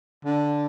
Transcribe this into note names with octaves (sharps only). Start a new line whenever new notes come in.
D3